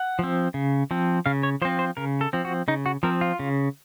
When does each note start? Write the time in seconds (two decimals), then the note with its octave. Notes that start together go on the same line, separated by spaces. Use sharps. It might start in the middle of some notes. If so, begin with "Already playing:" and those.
Already playing: F#5
0.19 F3 C4
0.54 C#3
0.91 F3 C4
1.26 C#3 F5
1.43 C#5
1.62 F3 C5
1.65 C4
1.79 C5
1.97 C#3 A#4
2.21 A4
2.33 F3 C4
2.45 F#4
2.68 C#3 D#4
2.86 F#4
3.03 F3 C4 A#4
3.21 F4
3.39 C#3